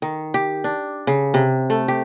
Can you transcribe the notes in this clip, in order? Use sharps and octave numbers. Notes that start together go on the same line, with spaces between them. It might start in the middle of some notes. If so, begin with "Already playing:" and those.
D#3
G4
D4
C#3
C3
A3
G4